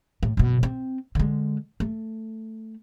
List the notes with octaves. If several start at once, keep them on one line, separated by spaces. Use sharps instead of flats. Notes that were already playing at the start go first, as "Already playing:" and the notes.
A2
F#1 B2
C4
D3 G#3
A3